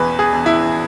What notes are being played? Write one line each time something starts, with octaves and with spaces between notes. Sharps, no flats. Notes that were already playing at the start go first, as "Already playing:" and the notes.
Already playing: E1 E2 B4
G#4
E1
E4